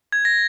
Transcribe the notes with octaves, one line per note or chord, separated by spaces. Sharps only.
G#6
A#6